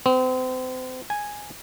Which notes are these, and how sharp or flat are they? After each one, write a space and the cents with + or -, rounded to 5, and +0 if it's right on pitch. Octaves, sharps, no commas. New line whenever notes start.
C4 -35
G#5 -5